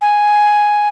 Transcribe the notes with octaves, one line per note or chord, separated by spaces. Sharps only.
G#5